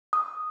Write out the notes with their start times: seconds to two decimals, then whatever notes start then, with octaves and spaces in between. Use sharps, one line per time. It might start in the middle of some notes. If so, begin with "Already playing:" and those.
0.13 D#6